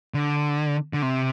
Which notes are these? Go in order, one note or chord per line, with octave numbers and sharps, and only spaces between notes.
D3
D3
C3